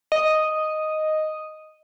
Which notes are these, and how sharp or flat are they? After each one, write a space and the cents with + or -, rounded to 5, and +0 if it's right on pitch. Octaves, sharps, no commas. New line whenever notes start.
D#5 +0